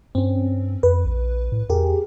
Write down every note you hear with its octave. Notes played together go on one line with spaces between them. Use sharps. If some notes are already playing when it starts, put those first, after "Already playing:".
G2 C4 C#4
F2 B4
A#1
A2
E2 G4 G#4 A#4